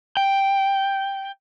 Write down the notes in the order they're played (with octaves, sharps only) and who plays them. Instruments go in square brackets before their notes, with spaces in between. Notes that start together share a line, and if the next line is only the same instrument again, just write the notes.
[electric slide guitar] G5